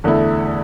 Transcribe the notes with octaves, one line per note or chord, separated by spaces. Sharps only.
E2 D3 A3 E4